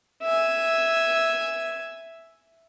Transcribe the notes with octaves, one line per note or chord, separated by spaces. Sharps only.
E5 G#5